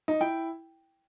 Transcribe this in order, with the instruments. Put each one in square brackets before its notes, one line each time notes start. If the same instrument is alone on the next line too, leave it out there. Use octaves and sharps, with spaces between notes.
[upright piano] D#4
[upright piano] E4 [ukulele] G5